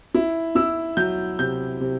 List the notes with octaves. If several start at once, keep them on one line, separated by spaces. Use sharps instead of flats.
E4
E4 E6
F#3 G6
C3 G6
C3